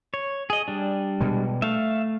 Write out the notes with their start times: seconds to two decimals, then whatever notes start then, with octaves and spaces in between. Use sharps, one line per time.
0.14 C#5
0.50 G#4 D#5
0.68 G3 D4
1.21 B2 G#3
1.62 A3 E5 F5